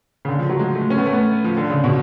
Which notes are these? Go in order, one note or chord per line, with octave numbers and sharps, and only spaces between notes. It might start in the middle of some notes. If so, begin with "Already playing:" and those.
C#3
D3
F3
F#3
G#3
A3
C#4
B3
A3
B3
F3
D3
C#3
B2